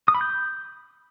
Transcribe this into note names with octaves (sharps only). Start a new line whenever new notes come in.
D#6
B5
G6